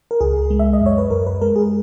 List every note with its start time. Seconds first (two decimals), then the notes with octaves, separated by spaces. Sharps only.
0.11 A#4
0.21 C#2 G#4
0.50 G#3
0.59 E5
0.73 D#5
0.81 F#2 C#5
0.98 B4
1.10 F#2 A#4
1.27 B4
1.41 G#3 A#4
1.56 G#4